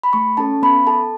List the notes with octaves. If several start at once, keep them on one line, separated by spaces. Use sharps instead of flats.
B5
A3 C#6
C#4 A4 A5
B3 B5
A4 A5